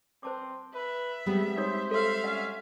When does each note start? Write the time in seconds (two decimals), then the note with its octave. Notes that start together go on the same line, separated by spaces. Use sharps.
0.23 C4 C5 A5 D6
0.75 B4 E5
1.26 G3 G#3 B3 C4
1.57 D#4 C5 C#5 D#6
1.91 A4 C#5 E5 F5 C6
2.24 C#4 D#5 F#5